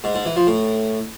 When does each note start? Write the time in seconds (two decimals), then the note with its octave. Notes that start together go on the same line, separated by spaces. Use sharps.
0.04 G#2
0.15 G#2
0.26 E3
0.36 F3
0.47 A2